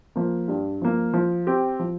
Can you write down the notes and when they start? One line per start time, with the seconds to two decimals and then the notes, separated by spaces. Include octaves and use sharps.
0.16 F3 A#3
0.48 G2
0.82 F3 A#3
1.13 F3
1.47 C4 G4
1.79 F3